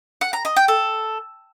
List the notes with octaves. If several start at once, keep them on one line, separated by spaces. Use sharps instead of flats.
F#5
A#5
D#5
G5
A4